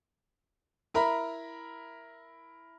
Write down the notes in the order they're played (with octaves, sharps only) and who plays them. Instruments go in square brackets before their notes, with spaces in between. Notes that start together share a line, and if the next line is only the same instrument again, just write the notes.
[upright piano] E4 A#4 A#5 B5